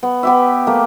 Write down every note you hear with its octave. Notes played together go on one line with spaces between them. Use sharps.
B3
B3 G4 E5
A3 A#3